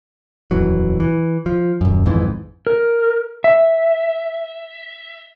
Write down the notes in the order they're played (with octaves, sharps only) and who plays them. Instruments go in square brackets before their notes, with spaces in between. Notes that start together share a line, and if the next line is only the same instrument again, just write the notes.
[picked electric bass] D#1 F2 E3 F#3
E3
F3
D#1 F#2
G#1 F2 G#2 E3
[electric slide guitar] A#4
E5